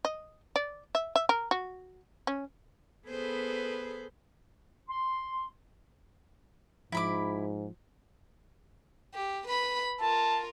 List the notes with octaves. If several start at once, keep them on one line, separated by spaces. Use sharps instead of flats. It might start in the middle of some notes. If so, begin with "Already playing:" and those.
D#5
D5
E5
E5
A#4
F#4
C#4
B3 G#4 A4 B4 C5
C6
G#2 F3 E4 B5 D6
G4
B4 B5
F4 A#4 A5